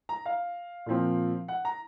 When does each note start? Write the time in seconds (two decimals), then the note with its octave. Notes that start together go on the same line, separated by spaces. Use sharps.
0.09 A#5
0.26 F5
0.86 A#2 F3 C4
1.48 F#5
1.65 A#5